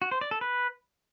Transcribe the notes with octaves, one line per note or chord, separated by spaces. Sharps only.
F#4
C5
D5
A4
B4